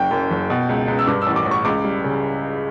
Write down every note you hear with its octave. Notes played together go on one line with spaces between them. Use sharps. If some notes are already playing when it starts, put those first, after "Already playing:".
Already playing: F#1 G5
F#2
F#1
B2
C#2
C#2
E6
G2 D6
A1 E6
D6
A1
C#6
C#2 D6
G3
C#3